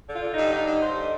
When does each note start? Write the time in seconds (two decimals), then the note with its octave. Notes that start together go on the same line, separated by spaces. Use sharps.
0.09 D3 F4
0.23 D3
0.33 G2 D#4
0.53 D3 D#4
0.67 G2
0.81 G2 C5
0.96 D3
1.02 D#5